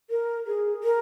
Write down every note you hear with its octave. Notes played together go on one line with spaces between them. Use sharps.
A#4
G#4
A#4